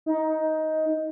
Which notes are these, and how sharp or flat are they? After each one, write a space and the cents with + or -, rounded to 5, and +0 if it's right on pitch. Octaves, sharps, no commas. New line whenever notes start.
D#4 +15